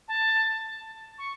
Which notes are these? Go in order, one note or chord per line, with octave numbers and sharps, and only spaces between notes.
A5
C#6